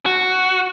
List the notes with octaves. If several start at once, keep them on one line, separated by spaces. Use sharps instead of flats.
F#4